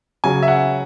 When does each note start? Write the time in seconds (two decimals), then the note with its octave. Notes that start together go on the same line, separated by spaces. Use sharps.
0.24 C#3 F#3 G#5
0.43 E5
0.48 F#5